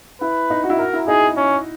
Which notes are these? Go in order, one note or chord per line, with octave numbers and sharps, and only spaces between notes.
E4 B4
D#4
F#4
E4
F#4 A#4
E4
D#4 G#4
C#4